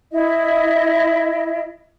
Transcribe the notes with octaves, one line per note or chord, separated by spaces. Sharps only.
E4 D#5